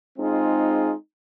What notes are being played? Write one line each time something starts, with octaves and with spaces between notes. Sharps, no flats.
G#3 C4 D#4 F4 G#4